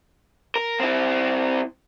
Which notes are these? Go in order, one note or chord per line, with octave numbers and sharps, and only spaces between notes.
A#4
C4 E4